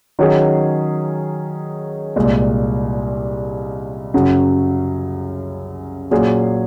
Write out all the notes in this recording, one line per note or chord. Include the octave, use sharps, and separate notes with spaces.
D#3 F#3 C#4 G#4
C2 A#2 G#3
F#2 C#3 F#3
A#2 F#3 C#4 G#4